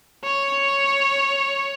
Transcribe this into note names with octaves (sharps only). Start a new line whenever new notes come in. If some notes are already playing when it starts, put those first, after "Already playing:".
C#5